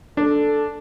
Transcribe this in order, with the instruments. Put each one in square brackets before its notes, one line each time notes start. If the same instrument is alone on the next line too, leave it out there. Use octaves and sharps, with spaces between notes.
[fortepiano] D4 [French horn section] A4